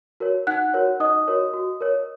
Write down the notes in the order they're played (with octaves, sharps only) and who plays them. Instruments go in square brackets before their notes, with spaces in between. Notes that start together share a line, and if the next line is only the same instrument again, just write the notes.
[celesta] F#4 A#4 C#5
D#4 F#5 F#6
F#4 A#4 C#5
D#4 D#5 D#6
F#4 A#4 C#5
F#4
A#4 C#5